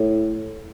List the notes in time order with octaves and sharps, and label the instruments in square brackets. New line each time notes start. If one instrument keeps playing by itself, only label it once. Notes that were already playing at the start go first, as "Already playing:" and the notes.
Already playing: [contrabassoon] A2